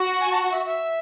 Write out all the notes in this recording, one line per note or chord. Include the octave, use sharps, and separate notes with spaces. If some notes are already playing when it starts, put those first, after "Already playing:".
Already playing: F#4
G#5
A5
F#5
E5
E5